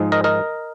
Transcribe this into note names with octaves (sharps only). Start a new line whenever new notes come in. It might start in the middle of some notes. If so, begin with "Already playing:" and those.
Already playing: G#2 F3 G#3 D#4
A#4 D#5
A#4 D#5